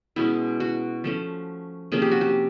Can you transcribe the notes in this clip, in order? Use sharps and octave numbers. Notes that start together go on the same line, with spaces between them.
B2 G#3 C#4 E4
F#4
F3 A3 C#4
C3 F3 A#3 C#4 G#4
G4
F#4
G4